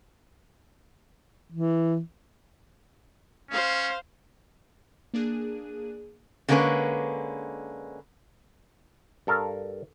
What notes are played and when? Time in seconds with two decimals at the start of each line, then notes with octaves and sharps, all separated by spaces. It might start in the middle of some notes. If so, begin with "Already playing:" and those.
1.52 E3
3.51 C#4 C5 F5
5.14 A#3 D4 G#4 F#6 D#7
6.49 D3 G#3 A#3 C#4 D#4 B4
9.27 G2 A4 A#4 F5